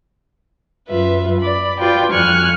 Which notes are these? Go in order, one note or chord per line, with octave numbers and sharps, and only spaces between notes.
F#2 F4 B4 E5
D5 B5
F4 F#4 B4 D5 G5
F2 G#5 C#6 F6 F#6